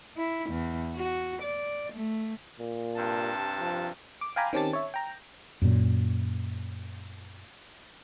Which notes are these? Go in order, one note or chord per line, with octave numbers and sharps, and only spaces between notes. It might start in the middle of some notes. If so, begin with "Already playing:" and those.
E4
E2
F#4
D5
A3
A#2
G2 C3 A5
F3
D6
F5 G5 G#5 A#5 B5 D6
D#3 C4 C#4 G4 A5 A6
C#5 E5
G5 A#5
F#2 A#2